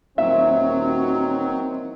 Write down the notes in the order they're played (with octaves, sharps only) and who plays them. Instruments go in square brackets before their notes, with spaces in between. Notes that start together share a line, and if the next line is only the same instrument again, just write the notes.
[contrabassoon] D#1 [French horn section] D#3 E3 C4 [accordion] F#3 [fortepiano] E5